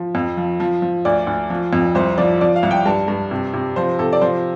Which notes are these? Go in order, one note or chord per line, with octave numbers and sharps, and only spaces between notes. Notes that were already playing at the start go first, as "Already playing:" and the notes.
Already playing: F3
F2
F3
F3
F3
D2 D5
D2
F3
F2
C2 C5
F3 D5
F3 D5
F5
C2
G5
G2 A5
G2
C3
C3
F3 C5
C3 A4
D5
F3 C5